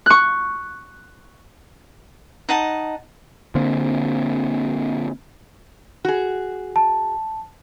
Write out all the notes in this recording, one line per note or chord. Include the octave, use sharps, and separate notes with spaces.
C#6 F#6
D#4 D#5 F#5 A5
D3 A#3 C4
F#4 G#4
A5